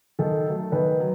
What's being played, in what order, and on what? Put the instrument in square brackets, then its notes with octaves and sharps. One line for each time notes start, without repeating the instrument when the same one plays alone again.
[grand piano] D#3 [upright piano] A4
[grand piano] F#3 A3
[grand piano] D#3 [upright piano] B4
[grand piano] F#3